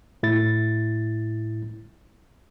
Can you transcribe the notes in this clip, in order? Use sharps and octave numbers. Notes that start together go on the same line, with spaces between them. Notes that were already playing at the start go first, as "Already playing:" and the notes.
A2 E4 A6